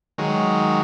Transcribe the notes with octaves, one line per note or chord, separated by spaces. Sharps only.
D#3 F#3 G#3